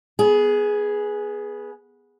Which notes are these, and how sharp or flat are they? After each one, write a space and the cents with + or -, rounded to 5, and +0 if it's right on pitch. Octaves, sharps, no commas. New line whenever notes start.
B3 -15 G#4 +5